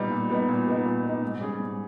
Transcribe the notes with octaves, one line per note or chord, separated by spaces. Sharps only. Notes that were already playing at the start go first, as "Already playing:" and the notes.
Already playing: A#2 G3 B3 D#4
A#2
G3 B3 D#4
A#2
G3 B3 D#4
A#2
G3 B3 D#4
G#2
G3 C#4 G#4
G#2